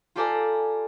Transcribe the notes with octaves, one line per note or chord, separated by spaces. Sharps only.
F4 G4 A4 D5 G#5 A#5